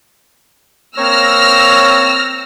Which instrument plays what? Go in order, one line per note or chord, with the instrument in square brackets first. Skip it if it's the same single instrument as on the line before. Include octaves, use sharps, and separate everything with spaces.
[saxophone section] A#3 C4 C#5 [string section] E6 F6 A#6